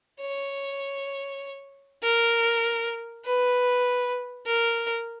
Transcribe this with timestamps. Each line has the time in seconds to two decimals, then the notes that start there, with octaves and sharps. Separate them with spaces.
0.20 C#5
2.02 A#4
3.24 B4
4.46 A#4